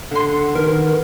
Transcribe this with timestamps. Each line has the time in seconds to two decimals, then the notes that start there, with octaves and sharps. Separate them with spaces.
0.11 D3 F#5 C6
0.55 D#3 A#4 B4